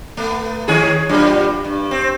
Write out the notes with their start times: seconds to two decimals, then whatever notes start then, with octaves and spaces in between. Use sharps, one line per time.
0.17 A3 B3
0.68 D#3 C#4 G#4
1.09 F#2 A#2 G3
1.65 G2
1.91 C4